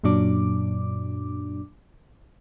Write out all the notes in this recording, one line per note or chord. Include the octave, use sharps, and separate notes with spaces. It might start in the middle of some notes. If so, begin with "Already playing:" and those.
F#2 A#2 F#3 D4 D6